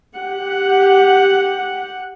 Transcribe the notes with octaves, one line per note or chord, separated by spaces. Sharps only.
G4 F#5